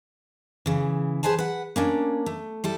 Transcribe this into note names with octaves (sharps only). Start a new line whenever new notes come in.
C#3 E3
G#4 B4 C5 G#5 A5
B4 F#5
A#3 C#4 D4
A3
G3 E4 A4